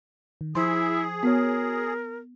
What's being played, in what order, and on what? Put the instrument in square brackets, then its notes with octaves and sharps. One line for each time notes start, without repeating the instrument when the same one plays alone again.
[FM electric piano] D#3
[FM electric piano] F3 C5 [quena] E4 [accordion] G#4 [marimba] C6
[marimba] B3 [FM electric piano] F#4 C#5 [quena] A#4